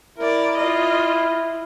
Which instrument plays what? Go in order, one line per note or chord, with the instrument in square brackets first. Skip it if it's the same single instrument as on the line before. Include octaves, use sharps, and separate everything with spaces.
[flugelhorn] E4 [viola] A#4 D5
[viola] F4 D#5